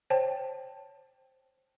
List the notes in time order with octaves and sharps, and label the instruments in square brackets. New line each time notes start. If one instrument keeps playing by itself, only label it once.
[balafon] C5 C#5 G5 A5